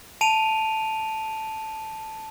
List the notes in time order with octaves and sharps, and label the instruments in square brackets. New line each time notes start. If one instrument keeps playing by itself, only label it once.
[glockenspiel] A5 D7 D#7 F7